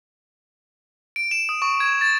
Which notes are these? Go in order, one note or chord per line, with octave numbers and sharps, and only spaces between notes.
D7
E7
D#6
C#6
G#6
A6